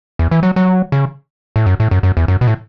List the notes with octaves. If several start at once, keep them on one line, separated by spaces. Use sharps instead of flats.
E2
E3
F#3
F#3
C#3
A2
F#2
A2
F#2
F#2
E2
F#2
B2
A2